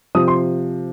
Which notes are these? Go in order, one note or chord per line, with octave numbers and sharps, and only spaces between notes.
C3 F3 D#6
C6